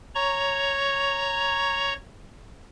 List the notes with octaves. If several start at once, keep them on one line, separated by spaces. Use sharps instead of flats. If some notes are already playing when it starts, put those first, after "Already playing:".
C#5 A#5 C#6